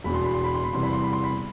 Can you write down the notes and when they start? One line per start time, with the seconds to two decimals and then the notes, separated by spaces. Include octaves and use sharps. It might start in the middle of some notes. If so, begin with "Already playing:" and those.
0.04 E1 E2 B2 B5
0.14 C6
0.24 B5
0.34 C6
0.44 B5
0.54 C6
0.63 B5
0.73 E2 C3 E3 G3 B3 C6
0.83 B5
0.93 C6
1.03 B5
1.13 C6
1.24 B5